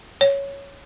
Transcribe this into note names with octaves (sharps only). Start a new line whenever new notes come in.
C#5